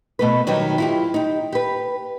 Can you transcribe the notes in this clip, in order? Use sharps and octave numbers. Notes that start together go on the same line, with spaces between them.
B2 A3 B4
D#3 F#3 G3 D#4 B4
E4 F4 G4
D#4 G4
G4 B4